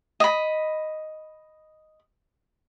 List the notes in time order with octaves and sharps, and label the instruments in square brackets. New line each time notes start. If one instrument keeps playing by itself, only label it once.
[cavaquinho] D#5 B5